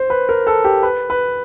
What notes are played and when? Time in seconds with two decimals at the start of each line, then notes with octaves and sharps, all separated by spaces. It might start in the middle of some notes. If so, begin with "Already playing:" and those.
Already playing: C5
0.10 B4
0.29 A#4
0.47 A4
0.64 G4
0.83 B4
1.10 B4